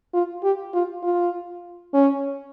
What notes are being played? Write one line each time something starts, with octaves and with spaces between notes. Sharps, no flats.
F4
G4
F4
F4
C#4